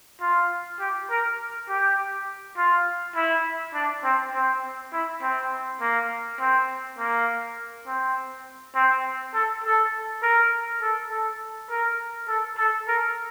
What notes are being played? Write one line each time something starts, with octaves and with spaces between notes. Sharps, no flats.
F4
G4
A#4
G4
F4
E4
D4
C4
C4
E4
C4
A#3
C4
A#3
C4
C4
A4
A4
A#4
A4
A4
A#4
A4
A4
A#4